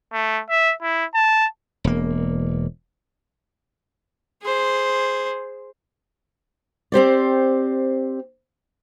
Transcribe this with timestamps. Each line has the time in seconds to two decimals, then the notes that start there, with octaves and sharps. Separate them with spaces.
0.13 A3
0.50 E5
0.82 E4
1.14 A5
1.84 E1 A#3
4.42 G#4 C5
6.92 C4 G4 C5 D5